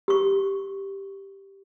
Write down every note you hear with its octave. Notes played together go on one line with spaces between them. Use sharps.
G4 C#6